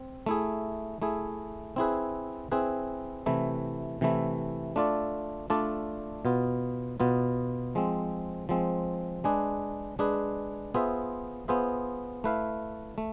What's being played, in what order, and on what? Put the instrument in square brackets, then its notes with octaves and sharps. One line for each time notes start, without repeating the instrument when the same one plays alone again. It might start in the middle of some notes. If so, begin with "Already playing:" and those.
Already playing: [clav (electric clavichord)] C4
A3 E4 G#4
A3 E4 G#4
C4 E4 G#4 B4
C4 E4 G#4 B4
C3 E3 A3 E4
C3 E3 A3 E4
A3 D4 F4 A4 D5
A3 D4 F4 A4 D5
B2 B3 F4
B2 B3 F4
F3 G#3 C4
F3 G#3 C4
G#3 D4 G#4 B4
G#3 D4 G#4 B4
B3 F4 G#4 C5 E5
B3 F4 G#4 C5 E5
A3 E4 B4 F5
A3